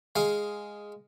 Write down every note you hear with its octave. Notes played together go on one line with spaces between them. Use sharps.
G#3 F5